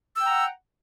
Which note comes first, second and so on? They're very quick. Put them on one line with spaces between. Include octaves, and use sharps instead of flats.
E6 G5 A#5 F#5